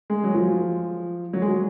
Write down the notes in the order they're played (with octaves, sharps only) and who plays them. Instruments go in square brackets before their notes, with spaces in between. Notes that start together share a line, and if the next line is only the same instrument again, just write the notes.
[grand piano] G#3
F#3
F3
F#3
G#3
F#3